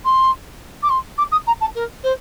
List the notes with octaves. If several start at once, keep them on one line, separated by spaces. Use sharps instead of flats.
C6
D6
C6
D6
D#6
A#5
A5
A#4
C5